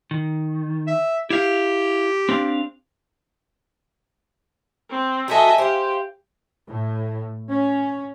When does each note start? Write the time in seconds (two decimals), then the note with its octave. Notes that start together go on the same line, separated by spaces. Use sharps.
0.11 D#3
0.87 E5
1.30 E4 G4 F5
2.29 C4 D4 F5
4.91 C4
5.28 F#3 F#4 A4 D#5 E5 G#5
5.58 G4 C5 F5
6.67 A2
7.49 C#4